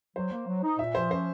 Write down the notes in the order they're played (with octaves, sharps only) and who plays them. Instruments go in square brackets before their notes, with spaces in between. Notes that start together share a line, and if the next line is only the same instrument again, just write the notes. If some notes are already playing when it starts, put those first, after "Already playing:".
[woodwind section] F#3 [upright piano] C5
[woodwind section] A#3
F#3
D#4
[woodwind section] A#2 [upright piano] E5
[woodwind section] F3 [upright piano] C5
[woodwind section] C#4 [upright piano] C5